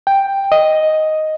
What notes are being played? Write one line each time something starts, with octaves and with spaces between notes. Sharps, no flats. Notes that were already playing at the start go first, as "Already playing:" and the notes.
G5
D#5